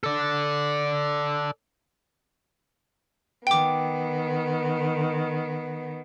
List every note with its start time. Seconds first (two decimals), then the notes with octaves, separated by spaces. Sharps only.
0.04 A4 D5
3.47 D#3 B3 G5 D6